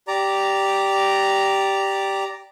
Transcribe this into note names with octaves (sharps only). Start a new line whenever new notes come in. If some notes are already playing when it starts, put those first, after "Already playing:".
G4 D5 A#5